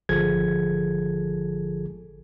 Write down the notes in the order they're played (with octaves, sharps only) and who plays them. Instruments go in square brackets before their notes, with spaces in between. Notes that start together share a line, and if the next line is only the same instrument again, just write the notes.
[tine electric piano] G#1 D3 F3 G#4 A4 G#6